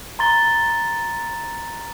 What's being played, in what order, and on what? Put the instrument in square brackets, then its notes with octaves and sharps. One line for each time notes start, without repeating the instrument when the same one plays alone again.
[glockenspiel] A#5 C6 A6 G7